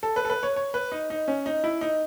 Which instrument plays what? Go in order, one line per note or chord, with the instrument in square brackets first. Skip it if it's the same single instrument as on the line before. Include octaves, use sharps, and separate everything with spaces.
[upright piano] A4
B4
A4
B4
C#5
C#5
B4
D#4
D#4
C#4
D#4
E4
D#4